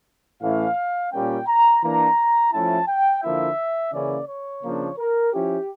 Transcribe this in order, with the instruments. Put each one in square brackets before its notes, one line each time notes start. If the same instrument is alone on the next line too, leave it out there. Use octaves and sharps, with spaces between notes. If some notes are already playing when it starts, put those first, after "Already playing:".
[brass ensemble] A2 E3 A3 C#4 F5
A#2 G3 A#3 C#4 G5
A#5
E3 A#3 D4 A#5
F3 A3 C#4 E4 A5
G5
D3 F3 A#3 E4 E5
C#3 E3 A#3 C#4 E4 D5
C#5
C#3 F3 A#3 D4
A#4
F3 C#4 E4 G4